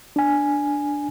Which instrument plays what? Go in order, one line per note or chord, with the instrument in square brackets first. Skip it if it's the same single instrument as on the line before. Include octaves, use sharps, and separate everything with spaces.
[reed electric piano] D4 G#5